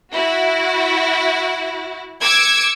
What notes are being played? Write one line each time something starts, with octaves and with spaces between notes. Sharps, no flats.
E4 F#4
D6 E6 G#6 C#7